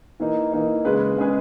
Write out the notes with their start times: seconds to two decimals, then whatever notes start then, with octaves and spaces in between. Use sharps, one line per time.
0.20 E3 A#3 D#4
0.53 E3 A#3 D#4
0.85 C#3 G#3 C#4 G#4 B4
1.17 C#3 G#3 C#4 G#4 B4